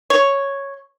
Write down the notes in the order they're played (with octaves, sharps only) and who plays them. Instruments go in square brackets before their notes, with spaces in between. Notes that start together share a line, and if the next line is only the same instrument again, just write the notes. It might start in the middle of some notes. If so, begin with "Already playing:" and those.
[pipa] C#5